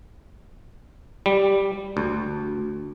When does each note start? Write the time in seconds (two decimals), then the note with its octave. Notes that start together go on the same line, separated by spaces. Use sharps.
1.26 G3
1.97 D2